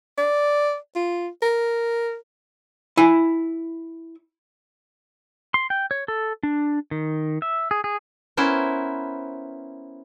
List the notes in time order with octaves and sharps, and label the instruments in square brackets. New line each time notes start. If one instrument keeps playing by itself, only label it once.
[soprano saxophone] D5
F4
A#4
[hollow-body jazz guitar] E4 G#5
[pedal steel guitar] C6
G5
C#5
A4
D4
D#3
E5
G#4
G#4
[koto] B3 C#4 E4 A#4 C5